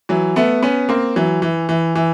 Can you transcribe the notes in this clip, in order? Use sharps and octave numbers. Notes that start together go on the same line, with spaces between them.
E3 F#3
A3 B3
B3 C#4
A#3 C4
E3 F#3
E3
E3
E3